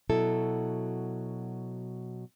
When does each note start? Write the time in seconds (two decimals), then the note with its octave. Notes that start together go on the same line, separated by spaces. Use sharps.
0.09 B2 F#3 E4 A4